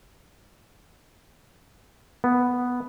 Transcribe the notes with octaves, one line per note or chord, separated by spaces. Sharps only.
B3